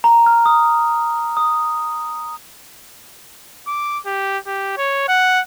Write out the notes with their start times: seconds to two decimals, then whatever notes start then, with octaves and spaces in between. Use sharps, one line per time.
0.04 A#5
0.26 F6
0.46 D#6
1.37 D#6
3.67 D6
4.06 G4
4.47 G4
4.77 C#5
5.08 F#5